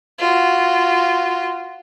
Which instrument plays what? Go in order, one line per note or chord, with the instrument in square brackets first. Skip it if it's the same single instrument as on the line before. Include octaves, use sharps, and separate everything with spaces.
[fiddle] F4 F#4